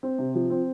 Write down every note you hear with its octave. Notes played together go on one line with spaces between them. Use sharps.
C4
C3
F3
C4